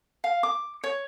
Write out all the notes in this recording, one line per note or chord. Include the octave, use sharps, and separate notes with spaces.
F5
D6
C#5